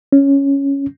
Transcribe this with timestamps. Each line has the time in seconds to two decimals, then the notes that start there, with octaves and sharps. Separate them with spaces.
0.12 C#4